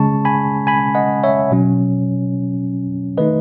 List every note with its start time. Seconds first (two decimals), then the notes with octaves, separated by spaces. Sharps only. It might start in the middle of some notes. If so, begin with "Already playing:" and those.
Already playing: C#3 G#3 C#4 A5 C#6
0.25 G#5 B5
0.67 G#5 B5
0.95 D#5 F#5
1.24 C#5 E5
1.51 B2 F#3 C#4
3.18 D#3 A3 D#4 B4 D#5